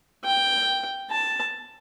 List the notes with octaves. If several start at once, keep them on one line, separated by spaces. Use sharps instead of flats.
G5
A5